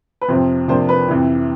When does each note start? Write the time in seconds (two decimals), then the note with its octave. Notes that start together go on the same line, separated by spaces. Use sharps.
0.21 B4
0.28 F2 C3 F3 C5
0.68 C3 F3 A#3 D4 C5
0.89 B4
1.08 F2 C3 E3